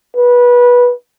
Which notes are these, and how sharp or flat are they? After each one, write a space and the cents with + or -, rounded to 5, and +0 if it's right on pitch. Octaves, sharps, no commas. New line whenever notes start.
B4 -20